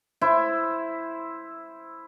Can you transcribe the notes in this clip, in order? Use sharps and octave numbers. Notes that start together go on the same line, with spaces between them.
E4 C5